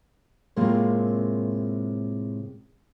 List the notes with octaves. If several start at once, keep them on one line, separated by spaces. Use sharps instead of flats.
A2 C3 G#3 A#3 C4 F4